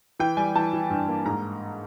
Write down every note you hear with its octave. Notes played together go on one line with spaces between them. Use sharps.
E3 G5
G3 G#5
E3 A5
E3
G2
A#3
G#2 A#5